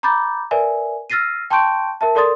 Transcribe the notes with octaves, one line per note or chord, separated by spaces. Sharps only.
A#5 B5 D6 G6 A6
A#4 B4 D5 E5 G#5
E6 F6 A6 A#6 C7 D#7
G5 A5 C6 C#6 G6 D7
A#4 E5 A5
A4 A#4 D5 C6 D#6 A6